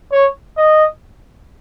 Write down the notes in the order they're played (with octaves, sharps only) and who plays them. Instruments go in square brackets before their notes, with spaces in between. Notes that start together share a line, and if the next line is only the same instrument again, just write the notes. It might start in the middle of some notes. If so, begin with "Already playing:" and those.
[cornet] C#5
D#5